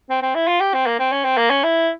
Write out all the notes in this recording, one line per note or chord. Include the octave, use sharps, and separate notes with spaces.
C4
C4
E4
F4
G4
C4
A#3
C4
C#4
C4
A#3
C#4
E4